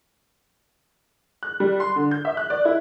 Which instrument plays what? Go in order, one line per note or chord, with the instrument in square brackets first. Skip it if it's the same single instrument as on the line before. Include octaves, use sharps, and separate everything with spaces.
[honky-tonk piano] F#6
G3
C6
D3
G6
E5
F#6
D5
E4